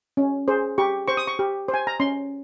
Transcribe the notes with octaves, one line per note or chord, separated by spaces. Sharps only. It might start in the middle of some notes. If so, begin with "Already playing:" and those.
C#4
G#4 C5
G4 C#6
C5 C#6
D#6
C#6
G4
C5
G#5
A#5
C#4 C6